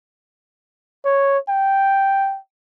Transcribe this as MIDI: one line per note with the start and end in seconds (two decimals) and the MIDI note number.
1.05 1.38 73
1.49 2.38 79